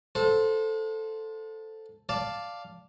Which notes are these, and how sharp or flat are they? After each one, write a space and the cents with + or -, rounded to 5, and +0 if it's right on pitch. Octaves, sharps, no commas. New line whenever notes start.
A4 +0 C5 +0 F#5 -45
D5 +0 F5 +0 A5 +0